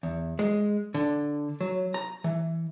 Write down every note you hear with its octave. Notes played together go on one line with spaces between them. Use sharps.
E2
G#3
D3
F#3
A#5
E3